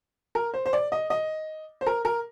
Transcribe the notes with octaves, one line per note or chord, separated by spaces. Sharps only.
A#4
C5
C5
D5
D#5
D#5
C5
A#4
A#4